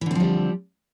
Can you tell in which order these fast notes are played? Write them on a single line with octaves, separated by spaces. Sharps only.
E3 D3 C4 F3 G3